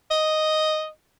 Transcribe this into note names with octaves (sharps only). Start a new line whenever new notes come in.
D#5